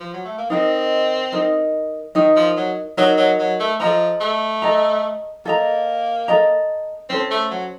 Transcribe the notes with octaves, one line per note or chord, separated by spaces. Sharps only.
F3
F#3
A3
A#3
C4 D#4 A#4 D#5
D#4 A#4 D#5
D#3 D#4 A#4 D#5
F3
F#3
F#3 D#4 A#4 D#5
F#3
F#3
A3
F3 A4 D#5 A#5
A3
A4 D#5 A#5
A#3 A4 D#5 A#5
A4 D#5 A#5
C4 C#4 A4 C5
A3
F#3